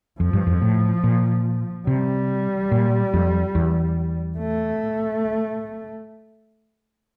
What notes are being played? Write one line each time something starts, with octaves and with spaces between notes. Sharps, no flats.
F2 F3
G2
F2
A2
A#2
C3 G3
A#2
F2
E2
A3